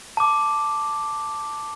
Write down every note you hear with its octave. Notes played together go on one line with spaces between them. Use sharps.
A5 D6